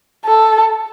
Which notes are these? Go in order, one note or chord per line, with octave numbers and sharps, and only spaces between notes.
A4